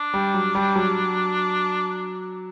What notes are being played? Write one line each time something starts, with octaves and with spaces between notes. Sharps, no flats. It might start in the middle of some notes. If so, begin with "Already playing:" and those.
Already playing: D4
G3
F#3
G3
F#3